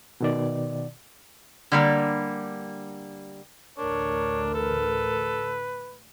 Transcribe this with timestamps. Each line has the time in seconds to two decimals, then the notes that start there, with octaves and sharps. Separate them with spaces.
0.21 B2 D#3 D5
1.72 D3 G3 A#3
3.78 A1 D2 D4 A#4 C#5
4.54 A4 B4